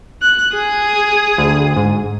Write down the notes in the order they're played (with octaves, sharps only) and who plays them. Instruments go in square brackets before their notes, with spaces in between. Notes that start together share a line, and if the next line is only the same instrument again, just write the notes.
[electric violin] F#6
G#4 D#6
[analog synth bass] D2
G#2